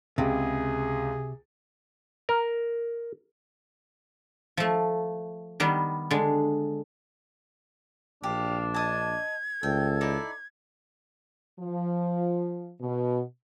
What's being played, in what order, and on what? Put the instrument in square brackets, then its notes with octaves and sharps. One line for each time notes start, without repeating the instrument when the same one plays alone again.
[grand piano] C#2 [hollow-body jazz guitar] C3 [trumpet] G#4
[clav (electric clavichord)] A#4
[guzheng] F3 A3
D#3 G3 B3
D3 G#3
[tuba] A#1 [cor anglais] D4 [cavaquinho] G4 [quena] F5
[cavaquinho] D#5 A5 [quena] G#6
[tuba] C#2 [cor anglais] A4 [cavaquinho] G5
[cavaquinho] D#4 E4 D5
[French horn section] F3
B2